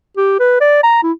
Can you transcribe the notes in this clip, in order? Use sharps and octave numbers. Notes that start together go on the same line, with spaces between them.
G4
B4
D5
A#5
E4